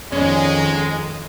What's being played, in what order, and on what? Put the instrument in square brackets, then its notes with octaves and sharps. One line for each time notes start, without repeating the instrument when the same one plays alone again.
[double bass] F2 D#3 [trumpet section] G#3 [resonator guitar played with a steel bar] C#4